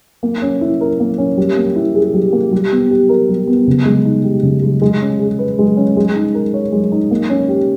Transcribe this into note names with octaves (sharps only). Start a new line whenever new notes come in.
A#3
C#4
E4
A#4
A#3
C#4
G3
A#3
E4
G#4
G3
A#3
G3
B3
G4
A#4
G3
B3
C#3
G#3
D#4
G4
C#3
G#3
G#3
C#4
G#4
B4
G#3
C#4
G#3
D#4
A#4
C#5
G#3
D#4
A#3
C#4
G4